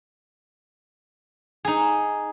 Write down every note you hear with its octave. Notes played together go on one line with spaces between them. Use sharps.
D#4 G#4